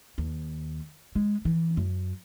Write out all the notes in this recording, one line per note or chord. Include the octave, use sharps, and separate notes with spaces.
D#2
G#3
E3
F#2